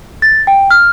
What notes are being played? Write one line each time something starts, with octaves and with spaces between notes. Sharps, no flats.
A6
G5
F6